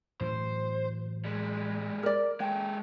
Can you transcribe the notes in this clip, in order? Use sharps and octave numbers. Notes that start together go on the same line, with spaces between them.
A2 E3 F#3 C5
G3 G#3
A#4 D5
G#3 A4 G5